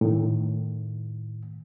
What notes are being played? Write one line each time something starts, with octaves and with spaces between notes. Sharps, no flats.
A2 D#3